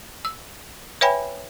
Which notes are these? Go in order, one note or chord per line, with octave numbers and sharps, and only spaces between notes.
E6
B4 C#5 E5 G5 G#5 B5